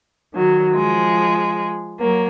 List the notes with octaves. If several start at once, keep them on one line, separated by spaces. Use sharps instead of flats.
D#3 F#3
F3 G#3
F#3 A#3